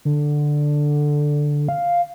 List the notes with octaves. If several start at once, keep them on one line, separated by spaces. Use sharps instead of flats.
D3
F5